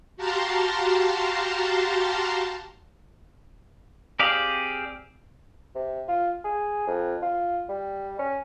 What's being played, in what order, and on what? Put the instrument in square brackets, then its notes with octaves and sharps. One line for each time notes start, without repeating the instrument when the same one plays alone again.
[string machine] F#4 G4 F5 A5 A#5 C6
[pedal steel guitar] C4 G4 G#4 D5 F5
[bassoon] C3
F4
G#4
F2
F4
G3
C#4